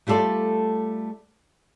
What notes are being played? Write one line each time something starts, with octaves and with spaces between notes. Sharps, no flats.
G3 A3 F4 A4 D5